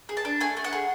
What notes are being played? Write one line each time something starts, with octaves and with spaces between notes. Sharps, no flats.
G#4
A5
D4
A3 G#5
A3
F#5
G#4